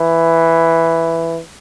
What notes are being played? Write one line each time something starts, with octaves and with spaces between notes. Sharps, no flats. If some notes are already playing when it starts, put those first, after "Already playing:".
Already playing: E3